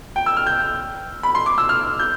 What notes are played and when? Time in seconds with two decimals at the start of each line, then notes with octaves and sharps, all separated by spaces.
0.16 G5
0.26 E6
0.37 F6
0.47 G6
1.23 B5
1.35 C6
1.46 D6
1.58 E6
1.69 F6
1.99 G6